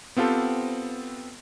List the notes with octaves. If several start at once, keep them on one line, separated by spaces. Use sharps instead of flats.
B3 C4 F4 G4 A4 C5